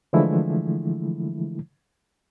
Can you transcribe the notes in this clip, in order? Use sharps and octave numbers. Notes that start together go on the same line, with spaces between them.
D3 E3 F3 G#3 A3 E4